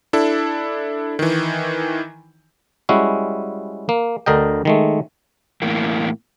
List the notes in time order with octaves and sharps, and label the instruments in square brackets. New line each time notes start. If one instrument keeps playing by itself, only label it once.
[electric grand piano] D4 E4 A4
D#3 E3
[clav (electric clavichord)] G3 G#3 C#4 E4 F#4
A#3
D2 D3 A#4 D#5 G5
D#3 G#3 A3
[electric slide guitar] E2 A2 A#3